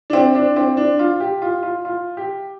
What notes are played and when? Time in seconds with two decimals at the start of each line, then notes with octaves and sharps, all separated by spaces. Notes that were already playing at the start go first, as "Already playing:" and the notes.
0.10 D4
0.13 C4
0.35 D4
0.56 C4
0.77 D4
0.99 F4
1.20 G4
1.42 F4
1.63 F4
1.85 F4
2.17 G4